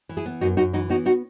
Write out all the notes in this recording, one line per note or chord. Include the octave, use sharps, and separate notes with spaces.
E3
E4 G#4
B3
F#2 D#4 F#4
F#2 D#4 F#4
E3 D#4 F#4
B3 D#4 F#4
D#4 F#4